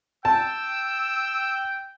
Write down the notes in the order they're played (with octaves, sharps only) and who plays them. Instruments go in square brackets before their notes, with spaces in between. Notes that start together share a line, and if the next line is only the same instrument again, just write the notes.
[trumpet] G5 [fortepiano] A5 [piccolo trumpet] E6